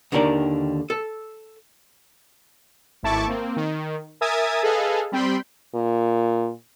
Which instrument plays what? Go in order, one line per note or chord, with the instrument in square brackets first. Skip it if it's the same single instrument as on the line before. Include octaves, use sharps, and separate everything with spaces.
[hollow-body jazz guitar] D#2 D3 D#3 A#4 D5
A4
[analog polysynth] G#1 A2 E4 A5 C#6 D6
A#3 C4
D#3
A#4 E5 G#5 D#6 G#6 A6
G#4 A4 B4 D#5 F5
G3 C4 G5 B5 C6
[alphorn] A#2